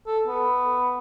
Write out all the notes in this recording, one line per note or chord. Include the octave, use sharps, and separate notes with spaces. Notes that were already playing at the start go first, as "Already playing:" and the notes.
A4
B3